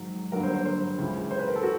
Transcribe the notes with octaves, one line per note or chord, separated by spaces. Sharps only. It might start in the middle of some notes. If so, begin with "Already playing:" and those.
Already playing: G#2 D#3 F#3
G2 D3 F#3 A#3 A#4
C5
C5
C5
C#2 C#3 E3
C5
B4
A#4
A4
F#4